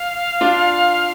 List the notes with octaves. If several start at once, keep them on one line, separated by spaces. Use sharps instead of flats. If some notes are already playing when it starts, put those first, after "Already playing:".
Already playing: F5
D4 F4